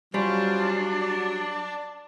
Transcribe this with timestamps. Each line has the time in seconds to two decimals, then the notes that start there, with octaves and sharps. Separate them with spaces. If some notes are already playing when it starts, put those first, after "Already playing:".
0.14 F#3 G3 C#4 D4 F4 C5
1.01 D5